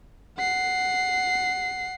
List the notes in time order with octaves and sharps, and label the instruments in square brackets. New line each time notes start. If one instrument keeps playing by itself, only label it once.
[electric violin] F#5 C7